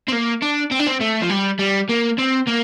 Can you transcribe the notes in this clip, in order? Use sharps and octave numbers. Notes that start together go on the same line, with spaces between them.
C4
A#3
D4
C4
D4
C4
A3
F3
G3
G3
A#3
C4
A#3